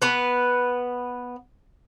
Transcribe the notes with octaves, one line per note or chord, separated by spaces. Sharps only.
B3 B4